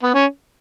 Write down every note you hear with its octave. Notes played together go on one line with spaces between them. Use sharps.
B3
C#4